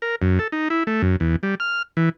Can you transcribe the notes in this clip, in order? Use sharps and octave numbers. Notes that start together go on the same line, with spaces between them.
A#4
F#2
A4
D#4
E4
A3
F#2
E2
G3
F6
E3